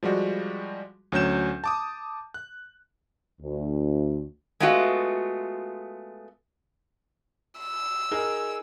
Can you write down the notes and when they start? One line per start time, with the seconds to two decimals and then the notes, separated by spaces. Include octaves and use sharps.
0.03 F3 G3 G#3 F#4
1.12 D2 F#3 C#4 G6 E7
1.64 A5 D6 D#6
2.34 F#6
3.40 D2
4.60 G#3 A3 B3 F4 F#4
7.60 E6
8.11 D#4 G#4 A#4